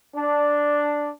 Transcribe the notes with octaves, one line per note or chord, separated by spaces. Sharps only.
D4